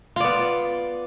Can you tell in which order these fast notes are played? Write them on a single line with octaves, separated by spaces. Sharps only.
F4 D5 B3